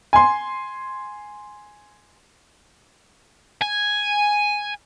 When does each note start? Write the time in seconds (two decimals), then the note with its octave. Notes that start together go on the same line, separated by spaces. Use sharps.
0.13 G#5 C6
3.61 G#5